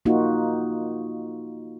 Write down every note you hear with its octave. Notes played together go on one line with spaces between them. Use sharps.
A#3 D#4 F4 F#4